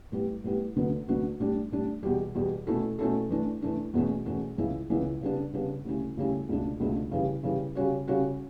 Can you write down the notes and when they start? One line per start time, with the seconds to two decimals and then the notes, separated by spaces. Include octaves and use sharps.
0.12 A2 G3 B3 E4
0.44 A2 G3 B3 E4
0.76 D2 D3 F#3 B3 F#4
1.08 D2 D3 F#3 B3 F#4
1.40 A2 G3 D4
1.72 A2 G3 D4
2.03 E2 B2 G3
2.35 E2 B2 G3
2.67 B2 A3 C#4 E4 A4
2.99 B2 A3 C#4 E4 A4
3.30 E3 A3 D4
3.62 E3 A3 D4
3.94 E2 B2 A3 C#4 F#4
4.26 E2 B2 A3 C#4 F#4
4.57 C#2 C#3 E3 B3 E4
4.90 C#2 C#3 E3 B3 E4
5.21 C#3 G3 B3 D4
5.53 C#3 G3 B3 D4
5.85 D2 C#3 G3 C#4 E4
6.17 D2 C#3 G3 C#4 E4
6.49 C#2 B2 A3 D4
6.80 C#2 B2 A3 D4
7.12 C#3 E3 G3
7.43 C#3 E3 G3
7.75 C#3 G3 C#4 F#4 C#5
8.08 C#3 G3 C#4 F#4 C#5